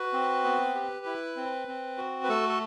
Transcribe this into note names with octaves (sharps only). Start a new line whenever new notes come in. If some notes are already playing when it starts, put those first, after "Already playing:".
Already playing: F#4 B4
C4
B3
G4
E4
C4
C4
F#4
B4
A3 A4
A4